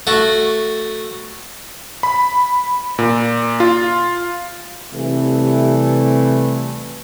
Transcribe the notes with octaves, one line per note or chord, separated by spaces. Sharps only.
A3 F#4
B5
A#2
F4
C3 E3 G3 A3